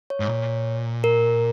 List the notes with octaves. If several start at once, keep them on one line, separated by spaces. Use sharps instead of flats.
C#5
G#2
A#2
A#4